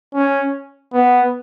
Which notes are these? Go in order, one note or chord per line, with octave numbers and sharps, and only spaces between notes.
C#4
B3